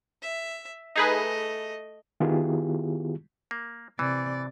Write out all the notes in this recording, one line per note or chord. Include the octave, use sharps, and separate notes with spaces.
E5
A3 D#4 G#4 B4 D#5
D#3 B3 E4 F4 G4 G#4
A#3
C3 E3 D5